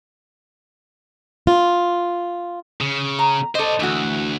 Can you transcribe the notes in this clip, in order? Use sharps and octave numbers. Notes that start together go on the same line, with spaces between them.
F4
C#3
A#5
A4 C5 D5 D#5
D2 E3 F#4